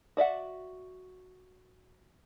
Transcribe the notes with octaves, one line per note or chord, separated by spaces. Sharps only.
F#4 D5 E5 F#5